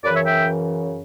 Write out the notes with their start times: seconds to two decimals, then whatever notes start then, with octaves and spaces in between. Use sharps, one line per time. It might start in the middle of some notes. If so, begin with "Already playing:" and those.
0.04 F#2 C#3 E3 B4 D5
0.15 C#5 E5
0.25 E5 G5